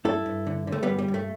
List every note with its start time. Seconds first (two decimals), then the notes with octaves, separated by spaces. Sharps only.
0.05 G2 E4 A4
0.26 G2
0.47 D3
0.67 D3
0.72 A3
0.83 G3 B3
0.88 G2
0.98 G3
1.08 G2
1.14 A3